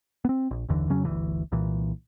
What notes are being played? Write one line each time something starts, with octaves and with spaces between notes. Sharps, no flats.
B3 C4
A#1
F#1 D#2 D3 E3
F2 C#3 F#3 C#4
G1 D2 E3
C2 A#2 E3